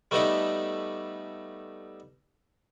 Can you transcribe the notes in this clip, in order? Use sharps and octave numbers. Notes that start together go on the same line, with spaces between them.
G3 A3 B3 D#4 A4 D5